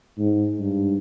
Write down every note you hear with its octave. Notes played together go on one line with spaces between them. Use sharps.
G#2
G2